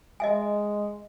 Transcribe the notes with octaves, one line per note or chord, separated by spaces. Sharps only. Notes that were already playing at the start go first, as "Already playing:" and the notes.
G#3 D#5 E5 G#5